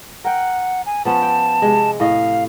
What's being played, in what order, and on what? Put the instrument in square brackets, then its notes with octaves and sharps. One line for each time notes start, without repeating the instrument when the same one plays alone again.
[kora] A#4 G5 [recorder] F#5
[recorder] G#5
[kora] F3 B3 C#4 [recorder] A5
[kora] G5
C3 G#3
[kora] A2 D#5 [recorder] F5